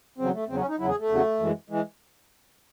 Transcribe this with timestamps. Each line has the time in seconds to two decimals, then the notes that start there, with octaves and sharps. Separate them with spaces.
0.18 E2 C#3 F#3 C4
0.34 A3
0.49 E2 C#3 F#3 C4
0.59 C#4
0.69 D#4
0.79 E2 C#3 F#3 E4
0.89 G#4
0.99 A3
1.09 E2 C#3 F#3
1.40 F#2 E3 G#3
1.70 E3 G#3